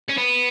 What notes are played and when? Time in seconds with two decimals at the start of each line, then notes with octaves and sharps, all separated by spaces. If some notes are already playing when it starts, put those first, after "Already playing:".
0.09 C#4
0.18 B3